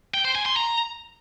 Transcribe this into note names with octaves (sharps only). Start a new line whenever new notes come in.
G5
C5
G#5
C6
A#5